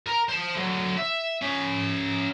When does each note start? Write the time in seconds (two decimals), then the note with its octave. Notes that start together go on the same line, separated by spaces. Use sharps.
0.06 A#4 A#5
0.29 C5 A5
0.55 D3 F#3
0.97 E5
1.42 C#4 E5